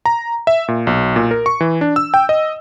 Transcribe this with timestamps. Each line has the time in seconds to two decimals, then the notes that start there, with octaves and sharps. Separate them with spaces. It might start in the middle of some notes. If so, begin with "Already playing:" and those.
0.06 A#5
0.47 E5
0.68 A#2
0.87 B1
1.16 A#2
1.31 A#4
1.46 C#6
1.60 E3
1.81 D4
1.96 E6
2.14 G5
2.29 D#5